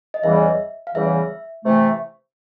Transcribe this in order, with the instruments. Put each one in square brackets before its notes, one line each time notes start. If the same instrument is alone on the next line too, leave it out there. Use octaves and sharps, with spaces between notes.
[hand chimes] D#5
[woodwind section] E2 C#3 E3 G3 [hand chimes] E5
[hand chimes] F5
[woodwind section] E2 C#3 E3 G3 [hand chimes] E5
[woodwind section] C3 E3 A3